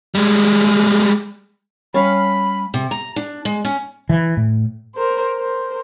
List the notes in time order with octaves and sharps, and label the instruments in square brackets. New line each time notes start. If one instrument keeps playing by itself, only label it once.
[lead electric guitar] G3 G#3
[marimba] G3 [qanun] C#4 F5 [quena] B5
[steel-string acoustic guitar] C3
A#5
D4
G#3
C#4
[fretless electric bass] E3
A2
[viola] A#4 C5
A#4 C5